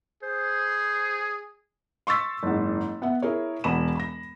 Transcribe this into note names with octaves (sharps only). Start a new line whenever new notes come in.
G#4 C5
C6 C#6 E6 A6 B6
F#1 G#2
B3 E5 F#5
E4 G#4 A#4 C#5
E1 E2 B5 E7
B5 A#6